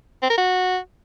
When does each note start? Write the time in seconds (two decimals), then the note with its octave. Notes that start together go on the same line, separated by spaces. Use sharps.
0.23 C4
0.30 A#4
0.38 F#4